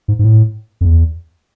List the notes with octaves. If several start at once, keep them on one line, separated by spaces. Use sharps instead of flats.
G#2
G#2
A2
F2
E2